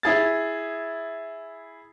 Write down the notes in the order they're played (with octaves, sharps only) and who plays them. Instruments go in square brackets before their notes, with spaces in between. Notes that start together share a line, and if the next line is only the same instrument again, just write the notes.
[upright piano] E4 G#4 A6